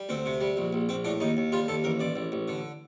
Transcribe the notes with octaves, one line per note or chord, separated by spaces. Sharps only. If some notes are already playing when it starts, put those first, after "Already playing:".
Already playing: G3
D2 C4
C3
G3
A#1
A#1
A#1 C4
A2 D4
D#2 D#4
D#2
G3 F4
D#2 A4
A1 A#4
A1 D5
A1
A1
D3